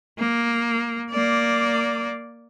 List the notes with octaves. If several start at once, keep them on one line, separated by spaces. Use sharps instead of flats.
A#3
A#3 D5